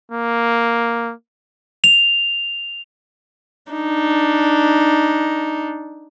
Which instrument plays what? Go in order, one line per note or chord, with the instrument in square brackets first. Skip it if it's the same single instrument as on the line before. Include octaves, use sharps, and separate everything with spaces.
[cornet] A#3
[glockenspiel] F7
[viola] D4 D#4